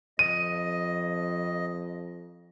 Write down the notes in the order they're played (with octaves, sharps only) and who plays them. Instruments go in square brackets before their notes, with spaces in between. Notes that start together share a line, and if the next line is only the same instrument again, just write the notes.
[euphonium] F2 [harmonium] D#5 [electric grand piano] D#7